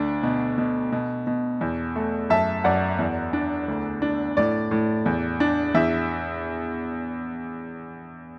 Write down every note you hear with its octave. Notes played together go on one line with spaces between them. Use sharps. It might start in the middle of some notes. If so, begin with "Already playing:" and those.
Already playing: D2 D4
B2
B2
B2
B2
E2
A3
F#2 E5 A5
F#2 D5 F#5
E2
D4
D2
D4
A2 D5
A2
E2
D4
E2 E5